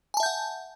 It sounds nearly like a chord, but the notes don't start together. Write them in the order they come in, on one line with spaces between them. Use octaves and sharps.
G#5 A5 E5 G6 F#5